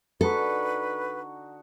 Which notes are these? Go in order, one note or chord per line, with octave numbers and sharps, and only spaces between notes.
D3 D#4 F#4 A4 B4